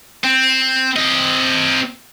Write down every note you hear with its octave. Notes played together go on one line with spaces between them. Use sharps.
C4
C4 D#5